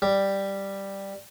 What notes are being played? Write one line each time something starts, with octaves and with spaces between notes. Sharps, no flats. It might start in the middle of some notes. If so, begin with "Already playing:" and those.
G3